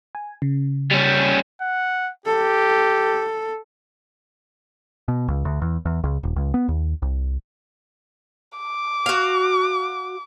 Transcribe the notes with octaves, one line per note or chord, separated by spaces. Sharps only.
G#5
C#3
G3 C#4
F#5
G4 A4
B2
C#2
D2
E2
E2
C#2
D#1
C#2
B3
D#2
C2
D6
F#4 F5